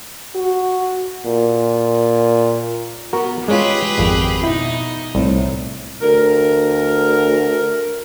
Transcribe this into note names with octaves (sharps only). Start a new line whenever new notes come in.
F#4
A#2
B3 F#4 A#4
G#3 C#4 F4 G4 G#4 B4
G#1 F2
B2 D#4 E4
C2 A2
D2 A#4